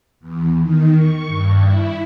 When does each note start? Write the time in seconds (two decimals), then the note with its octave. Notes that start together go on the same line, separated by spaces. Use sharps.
0.20 E2
0.60 D#3
0.96 C#6
1.27 G2
1.60 E4